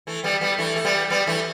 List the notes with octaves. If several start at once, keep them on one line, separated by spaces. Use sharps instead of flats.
E3 A3
G3 B3
G3 B3
E3 A3
A3
G3 B3
G3 B3
E3 A3